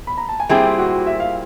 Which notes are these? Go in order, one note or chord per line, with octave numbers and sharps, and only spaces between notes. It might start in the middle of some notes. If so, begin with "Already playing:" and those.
B5
A#5
A5
G#5
A#2 G3 C4 E4 G4 G#4 G5
F#4 F#5
E5
F5